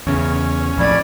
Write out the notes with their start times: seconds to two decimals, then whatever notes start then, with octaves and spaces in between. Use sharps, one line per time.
0.07 E2 C#3 C#4
0.77 A#1 F2 A2 D5 B5 G#6